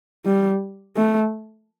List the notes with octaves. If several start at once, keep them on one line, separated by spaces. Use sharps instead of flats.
G3
A3